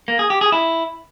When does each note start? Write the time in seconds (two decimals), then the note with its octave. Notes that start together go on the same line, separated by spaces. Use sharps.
0.08 A#3
0.19 G#4
0.30 G4
0.41 G#4
0.52 E4